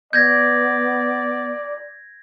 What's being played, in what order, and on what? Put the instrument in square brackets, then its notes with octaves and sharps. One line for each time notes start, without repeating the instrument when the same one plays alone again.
[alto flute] B3 [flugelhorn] D5 [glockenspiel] G6 G#6 A#6